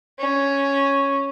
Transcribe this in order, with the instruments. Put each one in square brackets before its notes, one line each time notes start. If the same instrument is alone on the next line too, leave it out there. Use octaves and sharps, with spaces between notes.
[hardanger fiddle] C#4